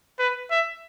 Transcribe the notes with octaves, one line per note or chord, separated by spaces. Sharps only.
B4
E5